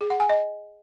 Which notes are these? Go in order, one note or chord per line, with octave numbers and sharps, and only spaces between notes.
G#4
F#5
G#5
D#5